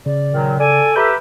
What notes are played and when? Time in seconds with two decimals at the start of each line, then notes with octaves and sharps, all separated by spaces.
0.06 C#3 D5
0.31 A#2 D#3 F#3
0.59 A4 D5 G#5
0.96 G4 B4 E5 A#5 B5 G6